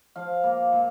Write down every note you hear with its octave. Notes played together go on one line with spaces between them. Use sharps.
F3 F5
A#3
A#2